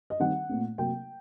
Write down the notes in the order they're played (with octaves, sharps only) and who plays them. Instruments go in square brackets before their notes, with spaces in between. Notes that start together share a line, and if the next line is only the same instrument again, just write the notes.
[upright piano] D#5
D#3 G3 C4 F#5
A#2 A3 C4
C3 F#3 A#3 G5